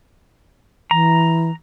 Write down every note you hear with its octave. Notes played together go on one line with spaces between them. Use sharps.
E3 A#5